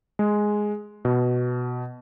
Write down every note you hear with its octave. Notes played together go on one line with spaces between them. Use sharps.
G#3
B2